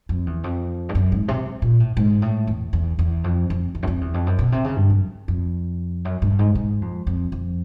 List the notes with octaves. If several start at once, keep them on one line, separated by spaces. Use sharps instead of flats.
F2
E2
F2
G2
F#2
G#2
C3
A#2
A2
G#2
A2
E2
E2
E2
F2
F2
E2
F#2
F2
E2
F2
F#2
B2
C3
C#3
G2
F#2
F2
F#2
G2
G#2
G#2
F2
F2
F2